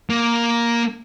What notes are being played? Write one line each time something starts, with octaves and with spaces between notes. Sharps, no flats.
A#3